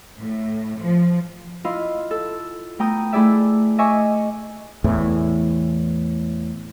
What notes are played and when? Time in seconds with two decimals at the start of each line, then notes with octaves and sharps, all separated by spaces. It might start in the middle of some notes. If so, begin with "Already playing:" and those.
0.18 A2
0.81 F3
1.64 E4 F4 D#5 F5
2.11 A4
2.79 A3 B3 G5 A#5 D#6
3.13 A3 E4 G#4 D5 E5
3.78 D#5 E5 G#5 C#6 D6
4.84 E2 A2 E3